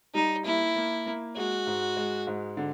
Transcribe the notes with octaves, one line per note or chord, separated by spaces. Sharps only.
G3 D#4
A#3 E4
A#3
A#3
G#3 F#4
G#2
G#3
G#2
D3